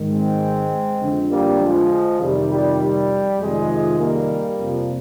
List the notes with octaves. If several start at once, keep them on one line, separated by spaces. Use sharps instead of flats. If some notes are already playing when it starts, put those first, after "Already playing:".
Already playing: G#2 D#3
G#3 C4
F2 D3 F3
G3 A#3
F3 G#3
F2 C3 D#3 G3
G3
G3
F2 C3 D#3 F3 G#3
G3 A#3
F2 C3 F3